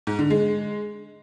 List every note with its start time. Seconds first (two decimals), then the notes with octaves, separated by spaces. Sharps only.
0.07 G#2
0.19 D3
0.30 G#3